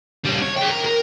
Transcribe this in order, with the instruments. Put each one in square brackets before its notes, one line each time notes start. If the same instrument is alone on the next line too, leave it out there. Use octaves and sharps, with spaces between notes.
[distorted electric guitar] G3 C#4
C#5
G#4 G5
A#4
A#4